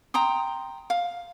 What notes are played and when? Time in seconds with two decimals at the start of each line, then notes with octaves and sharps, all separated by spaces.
0.14 G5 A#5 C6 D#6
0.90 F5